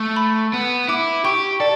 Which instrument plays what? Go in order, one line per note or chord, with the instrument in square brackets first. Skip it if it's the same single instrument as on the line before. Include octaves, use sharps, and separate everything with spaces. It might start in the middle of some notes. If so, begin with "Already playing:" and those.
Already playing: [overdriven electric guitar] A3
[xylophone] B5
[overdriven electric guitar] B3
[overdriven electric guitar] E4 [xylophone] D6
[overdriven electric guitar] G4 [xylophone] C#6
[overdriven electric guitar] A4 [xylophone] D5